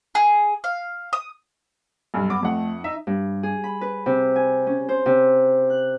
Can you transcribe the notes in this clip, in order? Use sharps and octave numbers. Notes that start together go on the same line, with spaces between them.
G#4
F5
D#6
B1 G2
B3 D6
F2 A3 F#5
D#4 E5
G2
G#4
B5
B4
C3
G#5
C#4
C5
C3
F#6